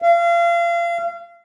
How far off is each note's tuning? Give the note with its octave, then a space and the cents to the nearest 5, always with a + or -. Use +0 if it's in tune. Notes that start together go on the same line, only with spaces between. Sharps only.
F5 -35